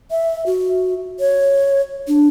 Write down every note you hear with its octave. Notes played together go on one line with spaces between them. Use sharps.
E5
F#4
C#5
D4